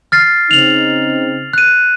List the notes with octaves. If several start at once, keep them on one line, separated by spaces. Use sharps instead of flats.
F6 A6 C7
C#3 C4 D#4 F7 F#7
F#6 D#7